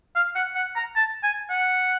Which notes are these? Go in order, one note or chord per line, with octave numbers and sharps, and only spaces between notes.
F5
F#5
F#5
A#5
A5
G#5
F#5